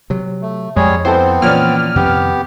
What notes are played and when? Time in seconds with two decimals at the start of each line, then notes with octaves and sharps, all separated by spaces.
0.10 C3 F#3
0.42 A3
0.76 F2 G3 G#3 G#4 C#5
1.05 B3 C4 E4 A4 C5
1.42 A#2 E3 F3 C#4 D5 F6
1.96 F2 C3 D#3 B3 G4